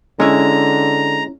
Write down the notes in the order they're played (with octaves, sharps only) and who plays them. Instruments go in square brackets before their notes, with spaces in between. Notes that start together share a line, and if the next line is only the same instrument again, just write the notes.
[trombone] D3 [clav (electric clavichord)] G#3 [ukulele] C#4 E4 [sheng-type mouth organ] A#5